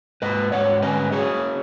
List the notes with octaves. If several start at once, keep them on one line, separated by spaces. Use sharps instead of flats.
G#2 B4 D#5
G#2 C#5 F#5
C#4 B4 D#5
F#3 G#4 C#5